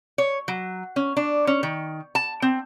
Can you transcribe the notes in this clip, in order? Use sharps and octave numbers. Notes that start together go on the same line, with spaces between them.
C#5
F#3
C#4
D4
C#4
D#3
A5
C4